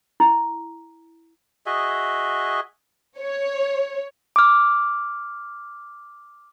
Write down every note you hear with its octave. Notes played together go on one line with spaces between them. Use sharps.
E4
F#4 G#4 D#5 E5
C#5
D6 F6